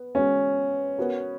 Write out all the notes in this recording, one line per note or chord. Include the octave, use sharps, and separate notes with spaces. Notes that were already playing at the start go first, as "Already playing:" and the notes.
Already playing: B3
G#3 B3 C#4 F#4
B3 F#4 A#4